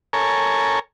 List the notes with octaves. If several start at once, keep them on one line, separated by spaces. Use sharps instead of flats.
A4 A#4 C#5 G#5